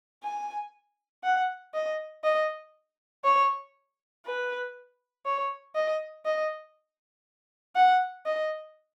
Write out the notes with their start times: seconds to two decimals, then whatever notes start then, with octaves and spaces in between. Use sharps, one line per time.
0.24 G#5
1.23 F#5
1.74 D#5
2.24 D#5
3.24 C#5
4.25 B4
5.26 C#5
5.76 D#5
6.26 D#5
7.76 F#5
8.26 D#5